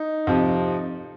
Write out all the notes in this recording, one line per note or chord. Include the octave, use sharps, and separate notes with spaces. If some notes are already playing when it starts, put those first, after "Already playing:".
Already playing: D#4
F2 C3 F3